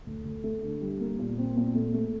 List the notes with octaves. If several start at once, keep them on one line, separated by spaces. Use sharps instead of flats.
D2
D2
A3
D3
G3
A#3
A#2
C4
A#2
A3
A3